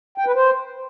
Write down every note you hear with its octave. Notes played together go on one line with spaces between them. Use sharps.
G5
B4
C5